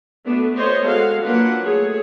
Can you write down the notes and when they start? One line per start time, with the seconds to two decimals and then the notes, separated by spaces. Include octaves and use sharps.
0.24 A3 B3 D4 F#4
0.55 B3 C5 C#5 D#5 C6
0.85 G#3 F#4 A4 F5 F#5
1.23 F#3 A#3 D4 F4 B4 F#5
1.64 A3 G#4 C#5